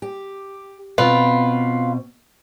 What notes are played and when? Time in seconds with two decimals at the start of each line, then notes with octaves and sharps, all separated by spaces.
0.02 G4
0.98 B2 C4 F4 B4